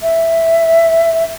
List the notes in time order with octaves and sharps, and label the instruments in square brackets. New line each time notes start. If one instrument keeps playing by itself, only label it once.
[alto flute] E5